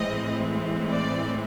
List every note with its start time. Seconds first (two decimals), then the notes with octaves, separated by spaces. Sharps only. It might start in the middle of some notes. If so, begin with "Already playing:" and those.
Already playing: A2 E3 G#3 C4 D#5
0.91 D5